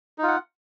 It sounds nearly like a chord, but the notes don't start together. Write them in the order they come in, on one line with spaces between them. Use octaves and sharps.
D#4 F4 F#5